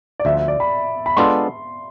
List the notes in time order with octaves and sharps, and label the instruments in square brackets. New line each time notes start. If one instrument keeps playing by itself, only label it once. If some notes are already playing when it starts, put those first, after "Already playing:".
[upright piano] D5
[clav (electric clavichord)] D2 D3 F3 [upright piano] E5
[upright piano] E5
D5
B5
B5
[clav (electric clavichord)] G#3 B3 D4 F4 A4 [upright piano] C6